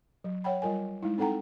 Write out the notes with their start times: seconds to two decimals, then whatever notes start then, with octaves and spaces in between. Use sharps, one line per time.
0.24 F#3
0.44 C#5 F#5 G5 B5
0.62 G3 F4 A#4 G#5
1.03 G#3 D#4 E4
1.18 C4 D#4 A4 F#5 G5 A#5